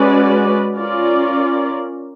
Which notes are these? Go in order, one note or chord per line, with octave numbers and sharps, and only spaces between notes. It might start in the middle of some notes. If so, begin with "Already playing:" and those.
Already playing: G#3 C#4 F#4 B4 D5
C#4 F4 A#4 D5